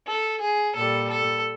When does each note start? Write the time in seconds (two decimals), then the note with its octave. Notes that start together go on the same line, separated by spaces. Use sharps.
0.08 A4
0.41 G#4
0.76 A#2 G3 A4
1.10 A4